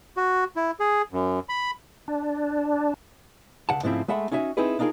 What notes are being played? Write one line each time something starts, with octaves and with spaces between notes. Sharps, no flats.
F#4
E4
G#4
F#2
B5
D4
C#2 C#3 F#5 A5
G#2 C#3 F3 A3 C4 E4
G#3 A3 E5 F#5 B5
C#4 D#4 F#4 E5 G#5
C4 D#4 E4 G#4 B4
D4 D#4 F4 G#4 A#4